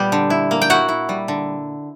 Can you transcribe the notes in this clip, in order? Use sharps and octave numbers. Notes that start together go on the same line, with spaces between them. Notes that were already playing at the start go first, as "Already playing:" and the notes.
Already playing: A#2 G3 B3 G4
D3
E4
A#3
G5
E4 F#4 F#5
E4
G3
D3